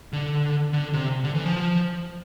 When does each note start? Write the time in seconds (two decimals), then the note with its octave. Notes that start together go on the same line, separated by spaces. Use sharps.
0.13 D3
0.73 D3
0.93 C3
1.24 D3
1.35 E3
1.44 F3